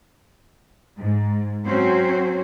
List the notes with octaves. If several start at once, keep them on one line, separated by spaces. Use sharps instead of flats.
G#2
F#3 C4 C#4 F#4 C5